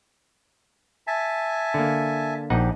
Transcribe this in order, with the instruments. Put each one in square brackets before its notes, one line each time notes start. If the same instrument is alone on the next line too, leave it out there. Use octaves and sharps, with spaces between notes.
[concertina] E5 G#5 A5
[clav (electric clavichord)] D3 A#3
[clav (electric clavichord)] A#1 D#4 F#5 [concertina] G4